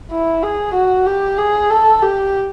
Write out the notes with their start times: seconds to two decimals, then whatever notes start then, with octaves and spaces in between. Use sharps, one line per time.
0.11 E4
0.43 G#4
0.75 F#4
1.07 G4
1.38 G#4
1.70 A4
2.02 G4